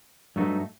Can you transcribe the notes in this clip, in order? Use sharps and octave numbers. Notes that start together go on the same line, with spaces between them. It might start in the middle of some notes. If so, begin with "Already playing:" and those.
G2 F#3 A3 D#4 F#4